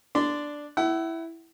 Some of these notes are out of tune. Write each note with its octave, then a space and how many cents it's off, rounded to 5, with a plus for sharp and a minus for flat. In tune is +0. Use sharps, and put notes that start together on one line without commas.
D4 +0 D5 +0 C6 -20
E4 +0 F#5 +35